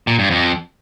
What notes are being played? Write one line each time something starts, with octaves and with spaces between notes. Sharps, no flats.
A#2
G2
F2